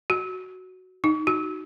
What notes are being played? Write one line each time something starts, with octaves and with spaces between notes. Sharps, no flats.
F#4
D#4
F#4